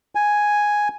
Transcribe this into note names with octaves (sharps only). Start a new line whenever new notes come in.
G#5